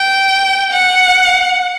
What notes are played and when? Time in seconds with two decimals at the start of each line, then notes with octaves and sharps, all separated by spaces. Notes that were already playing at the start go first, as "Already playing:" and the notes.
Already playing: G5
0.72 F#5